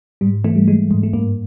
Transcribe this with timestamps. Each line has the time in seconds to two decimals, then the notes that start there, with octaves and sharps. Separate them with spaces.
0.21 G#2 G3
0.44 E3 A3
0.56 G3
0.68 E3 G#3
0.91 G#2
1.03 A3
1.13 G2 A#3